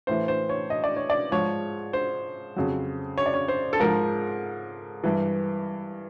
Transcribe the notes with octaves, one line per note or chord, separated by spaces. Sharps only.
A2 E3 C5
C5
C#5
D#5
D5
C#5
D5
G#2 F3 C#5
C5
F2 C#3 F#3
C#5
D5
C#5
C5
A4
G#2 F3 A#4
G2 E3